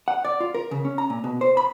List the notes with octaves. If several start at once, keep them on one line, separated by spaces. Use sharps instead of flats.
F#5
D5
F4
A#4
C#3
C#4
A#5
A#2
B2
C5
B5